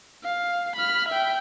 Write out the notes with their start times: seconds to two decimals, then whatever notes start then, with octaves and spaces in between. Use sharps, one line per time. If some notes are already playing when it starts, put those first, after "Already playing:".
0.24 F5
0.76 B5 F6
1.08 E5 G5